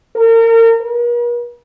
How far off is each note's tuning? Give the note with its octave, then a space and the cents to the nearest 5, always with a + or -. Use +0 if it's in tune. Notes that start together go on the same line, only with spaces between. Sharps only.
A#4 -35
A#4 +45